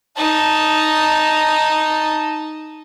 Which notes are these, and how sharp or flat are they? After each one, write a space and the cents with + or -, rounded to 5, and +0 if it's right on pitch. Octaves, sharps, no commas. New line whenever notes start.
D#4 +0 A5 +0